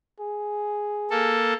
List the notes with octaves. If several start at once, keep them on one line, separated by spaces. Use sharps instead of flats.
G#4
A#3 A4